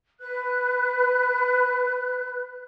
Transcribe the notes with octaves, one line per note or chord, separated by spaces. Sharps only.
B4 F#6